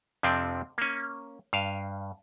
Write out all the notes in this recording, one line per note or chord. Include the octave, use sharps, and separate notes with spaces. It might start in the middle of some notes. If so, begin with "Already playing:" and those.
F2 C3 F3 C4 D4
A#3 C#4
G2 F5